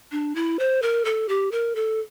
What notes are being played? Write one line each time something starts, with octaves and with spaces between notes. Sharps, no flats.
D4
E4
C5
A#4
A4
G4
A#4
A4